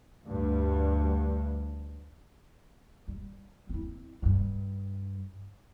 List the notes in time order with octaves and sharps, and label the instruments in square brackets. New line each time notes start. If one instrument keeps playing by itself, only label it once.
[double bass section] D2 G2
[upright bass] G3
C4 E4
G2 F4